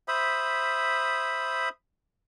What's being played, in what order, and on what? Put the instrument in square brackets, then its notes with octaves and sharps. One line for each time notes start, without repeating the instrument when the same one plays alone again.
[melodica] C5 E5 B5 D#6